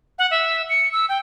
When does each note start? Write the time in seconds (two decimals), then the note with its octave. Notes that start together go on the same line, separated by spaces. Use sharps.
0.18 F#5
0.31 E5
0.69 C#7
0.92 E6
1.09 G5